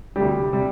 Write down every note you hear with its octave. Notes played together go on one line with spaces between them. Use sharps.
D2 C3 G3 G4
C3 G3